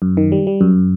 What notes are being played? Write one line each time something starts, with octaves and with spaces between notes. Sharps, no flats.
F#2
D#3
G3
G3
F#2